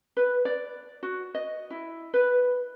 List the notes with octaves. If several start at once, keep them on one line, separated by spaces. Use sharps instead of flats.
B4
D5
F#4
D#5
E4
B4